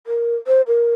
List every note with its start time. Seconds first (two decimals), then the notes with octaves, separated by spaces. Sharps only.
0.07 A#4
0.47 C5
0.67 A#4